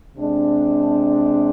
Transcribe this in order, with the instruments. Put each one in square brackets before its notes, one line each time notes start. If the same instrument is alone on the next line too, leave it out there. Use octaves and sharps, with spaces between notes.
[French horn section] C3 G#3 D4